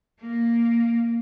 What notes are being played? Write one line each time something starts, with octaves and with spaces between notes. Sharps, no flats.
A#3